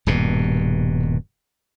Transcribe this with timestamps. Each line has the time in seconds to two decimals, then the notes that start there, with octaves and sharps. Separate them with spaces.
0.07 D#1 G2 B2